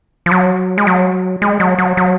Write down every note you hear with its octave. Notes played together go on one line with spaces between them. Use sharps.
F3
F#3
G#3
F#3
G#3
F#3
F#3
F#3